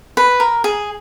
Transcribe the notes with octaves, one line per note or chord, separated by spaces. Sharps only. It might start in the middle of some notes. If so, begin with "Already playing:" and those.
B4
A#4
G#4